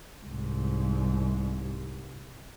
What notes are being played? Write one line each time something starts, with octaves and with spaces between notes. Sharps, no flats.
C2 G#2